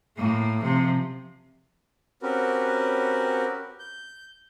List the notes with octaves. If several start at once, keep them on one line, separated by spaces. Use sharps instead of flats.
A2 A#3
C3 F3
C4 C#4 F#4 G4 A#4 B4
G6